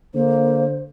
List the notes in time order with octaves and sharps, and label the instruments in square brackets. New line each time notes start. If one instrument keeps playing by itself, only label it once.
[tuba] D3 [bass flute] A#3 [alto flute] C5